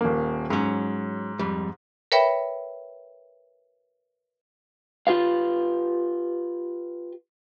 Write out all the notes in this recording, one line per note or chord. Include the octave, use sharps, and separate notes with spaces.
D#1 A#3
G#2 F#3 C#4
F2 G3
A#4 B4 C#5 E5 G5 B5
F4 G4 B4 F5